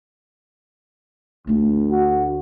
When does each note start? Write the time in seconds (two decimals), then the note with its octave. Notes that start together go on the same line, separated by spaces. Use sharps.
1.47 D2 A3 D4
1.90 F#4